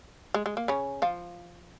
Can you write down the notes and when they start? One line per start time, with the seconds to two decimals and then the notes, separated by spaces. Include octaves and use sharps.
0.34 G#3
0.46 G#3
0.57 A#3
0.68 C#3 C#4
1.02 F3 F4